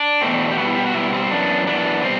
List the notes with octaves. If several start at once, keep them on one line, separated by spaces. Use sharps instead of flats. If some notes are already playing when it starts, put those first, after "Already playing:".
Already playing: D4
E2 B2 A3 C4
G4
B2 G3 B3 F#4
E4
G4
F#4
B2 G3 B3 E4
C4
F#2 E3 B3 D4
F#2 E3 B3 D4
B2 G3 C4 C5